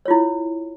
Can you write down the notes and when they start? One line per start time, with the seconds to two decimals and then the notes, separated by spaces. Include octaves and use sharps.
0.06 C#5
0.08 F4
0.11 E4